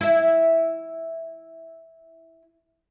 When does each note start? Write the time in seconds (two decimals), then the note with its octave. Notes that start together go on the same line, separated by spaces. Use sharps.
0.01 E4 E5